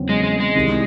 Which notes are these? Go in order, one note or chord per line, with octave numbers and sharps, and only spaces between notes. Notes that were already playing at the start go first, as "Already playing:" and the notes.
Already playing: E2 C#3 F#3 C4
G#3
G#3
G#3
C2 C3 D#3